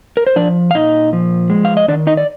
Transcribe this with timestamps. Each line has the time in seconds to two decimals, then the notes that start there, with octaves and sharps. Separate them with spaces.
0.17 A#4
0.27 C5
0.36 F3 D4 D5
0.71 F5
0.74 A#2 D#4 D#5
1.13 F3
1.50 G#3
1.65 F5
1.77 D#5
1.88 D#3 D4 D5
2.07 D#4 D#5
2.17 D5